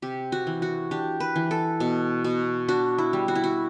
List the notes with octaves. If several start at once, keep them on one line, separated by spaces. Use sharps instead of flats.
C3 G4
F#4
E3
F#4
D4 G4
B4
E3
A4
B2
B2
D4 F#4
E4
G3
F#4
E4
F#4